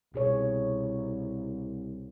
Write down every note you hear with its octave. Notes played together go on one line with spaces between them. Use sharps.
C2 B2 G#4 C#5